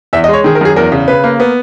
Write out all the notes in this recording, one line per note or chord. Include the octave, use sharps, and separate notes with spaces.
E2 E5
D#5
G#3
C#5
D#3 G#4
A#4
F#2 G#4
E2 A#4
C#3
C#3 B4
A#3
B3